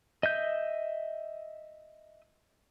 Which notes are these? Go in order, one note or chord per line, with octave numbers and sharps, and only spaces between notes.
D#5 E5 G6